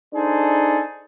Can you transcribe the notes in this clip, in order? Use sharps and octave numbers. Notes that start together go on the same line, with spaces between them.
D4 D#4 G#4 A4 C5